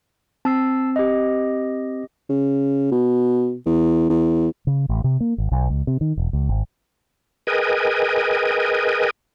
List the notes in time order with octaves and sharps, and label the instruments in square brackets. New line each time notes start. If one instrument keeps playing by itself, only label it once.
[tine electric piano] C4 [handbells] A5 E6 C7
[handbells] G4 D#5
[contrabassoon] C#3
B2
E2
E2
[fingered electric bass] C#3
A1
C3
A#3
G#1
B1
C#2
C3
D#3
E1
C#2
G#1
[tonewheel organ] G#4 A#4 B4 D#5 G5 G#5